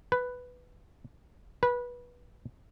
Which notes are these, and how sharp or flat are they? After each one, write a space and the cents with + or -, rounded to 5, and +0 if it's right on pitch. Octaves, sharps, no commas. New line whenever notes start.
B4 +5
B4 -20